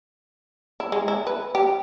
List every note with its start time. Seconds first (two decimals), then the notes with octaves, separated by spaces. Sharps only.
0.80 E4
0.92 G#3
1.08 E4
1.27 B4
1.55 G4